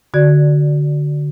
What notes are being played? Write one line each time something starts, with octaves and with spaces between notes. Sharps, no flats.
D3 F#4 D5 G#6